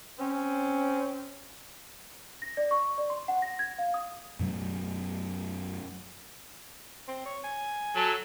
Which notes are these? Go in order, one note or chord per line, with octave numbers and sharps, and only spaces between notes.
C4 C#4
A#6
D5
C#6
D5
C6
F#5
A#6
G#6
F5
D#6
F#2 B2 F#3 A3
C4
C#5
G#5
F#3 A4